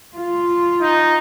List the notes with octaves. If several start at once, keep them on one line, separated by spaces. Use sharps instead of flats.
F4
D#4